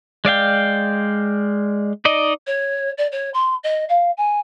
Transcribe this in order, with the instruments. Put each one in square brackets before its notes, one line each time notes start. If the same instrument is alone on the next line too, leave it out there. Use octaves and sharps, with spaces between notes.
[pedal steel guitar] G#3 D5 F5 G5
D#4 D5 D#5
[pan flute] C#5
D5
C#5
C6
D#5
F5
G#5